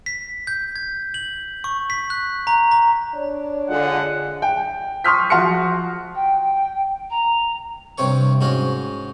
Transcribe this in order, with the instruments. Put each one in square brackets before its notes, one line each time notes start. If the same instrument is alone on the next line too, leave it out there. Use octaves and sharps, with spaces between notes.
[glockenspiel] B6
G6
G#6
F#7
C#6
B6
F#6
A#5
A#5
[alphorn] D4 [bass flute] C#5
[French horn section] D3 G#3 F4 [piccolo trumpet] F#5
[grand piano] G5
C6 C#6 D#6 F6 G6 B6
F3 F#4 C6 F6 C#7
[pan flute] G5
A#5
[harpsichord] G2 C3 C4 C#5 C#6
G#2 C#4 F#4 F5